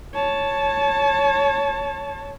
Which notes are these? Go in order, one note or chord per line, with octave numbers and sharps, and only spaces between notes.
C#5 A5